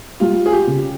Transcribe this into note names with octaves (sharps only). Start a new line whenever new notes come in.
G3 F4
G#4
G4
C#3